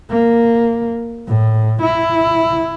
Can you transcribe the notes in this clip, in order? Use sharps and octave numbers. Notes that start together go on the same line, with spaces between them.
A#3
A2
E4